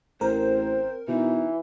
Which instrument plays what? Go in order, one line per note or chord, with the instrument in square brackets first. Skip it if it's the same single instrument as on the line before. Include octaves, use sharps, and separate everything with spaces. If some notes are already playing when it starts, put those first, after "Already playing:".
[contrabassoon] A1 [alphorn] C4 [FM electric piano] A#4 [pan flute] C5
[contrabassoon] B2 [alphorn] E3 [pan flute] D#4